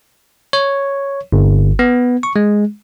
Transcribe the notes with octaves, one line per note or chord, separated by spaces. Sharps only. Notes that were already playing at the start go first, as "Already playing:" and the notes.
C#5
G1
B3
C#6
G#3